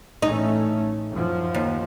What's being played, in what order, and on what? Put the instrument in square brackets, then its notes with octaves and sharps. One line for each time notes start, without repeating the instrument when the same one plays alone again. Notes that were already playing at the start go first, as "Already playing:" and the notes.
[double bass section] A1 A3 C#4 [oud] D#4
[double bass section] F#2 F3
[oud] D#2